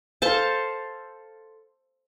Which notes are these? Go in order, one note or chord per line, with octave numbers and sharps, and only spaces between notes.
A4 C5 F5 A5